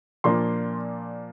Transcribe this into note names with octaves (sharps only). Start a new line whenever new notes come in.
A#2 F3 A#3 D4 C6